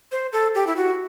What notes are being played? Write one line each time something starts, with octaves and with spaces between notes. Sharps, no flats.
C5
A4
G4
E4
F#4